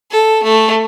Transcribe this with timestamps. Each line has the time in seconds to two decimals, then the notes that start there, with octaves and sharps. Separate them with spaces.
0.11 A4
0.43 A3